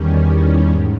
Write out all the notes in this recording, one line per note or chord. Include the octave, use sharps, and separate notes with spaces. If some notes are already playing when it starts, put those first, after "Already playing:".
Already playing: E2 D#3 G3 C#4
G#2